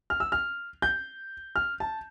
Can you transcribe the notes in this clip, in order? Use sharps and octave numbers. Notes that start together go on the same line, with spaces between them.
F6
E6
F6
G6
F6
A5